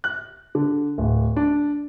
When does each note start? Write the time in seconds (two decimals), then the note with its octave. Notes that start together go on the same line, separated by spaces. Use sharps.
0.04 F#6
0.55 D3
0.98 D1
1.36 D4